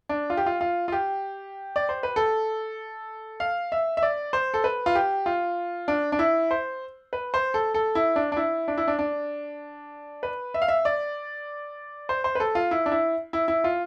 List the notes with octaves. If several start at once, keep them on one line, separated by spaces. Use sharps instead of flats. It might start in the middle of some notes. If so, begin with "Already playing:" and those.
D4
F4
G4
F4
F4
F4
G4
D5
C5
B4
A4
F5
E5
E5
D5
C5
A4
B4
F4
G4
F4
D4
D4
E4
C5
B4
C5
A4
A4
E4
D4
D4
E4
D4
E4
D4
D4
B4
E5
F5
E5
D5
C5
C5
B4
A4
F4
E4
D4
E4
E4
E4
F4